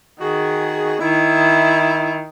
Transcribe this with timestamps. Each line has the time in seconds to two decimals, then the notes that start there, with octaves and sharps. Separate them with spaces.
0.21 D#3 F#4 G#4
1.01 D#3 E4